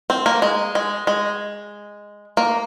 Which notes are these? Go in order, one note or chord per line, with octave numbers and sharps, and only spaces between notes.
C4
A#3
G#3
G#3
G#3
A#3